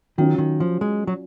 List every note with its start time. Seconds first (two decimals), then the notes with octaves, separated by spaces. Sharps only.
0.18 D#3 F#3 C#4 F4
0.38 D#3
0.60 F3
0.81 G#3
1.07 F#3